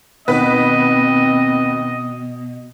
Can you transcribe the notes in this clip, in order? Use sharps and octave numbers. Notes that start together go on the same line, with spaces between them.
D#2 B2 C4 B4 D#5